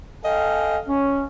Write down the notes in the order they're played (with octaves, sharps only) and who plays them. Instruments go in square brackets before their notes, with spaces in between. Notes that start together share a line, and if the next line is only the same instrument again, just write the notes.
[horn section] A4 D#5 F5 G5 G#5
C#4